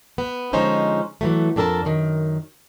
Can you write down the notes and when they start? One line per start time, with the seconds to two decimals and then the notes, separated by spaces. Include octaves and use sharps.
0.18 B3
0.53 D3 F3 G#3 C#4 D#4 C5
1.21 E3 F#3 A3
1.56 F2 D4 A4 A#4 A5
1.85 F#2 D#3